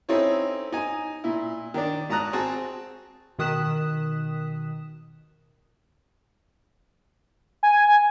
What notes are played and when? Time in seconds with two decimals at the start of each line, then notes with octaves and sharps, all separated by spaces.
0.09 C4 C#4 D#4 E4 A4 C#5
0.72 D#4 G#5
1.24 A#2 E4
1.74 D#3 D4
2.09 G#1 A5 A#5 D#6 F#6
2.33 C4 F#4 G#4 A5
3.39 B2 D#3 D#6 F#6 B6 E7
7.63 G#5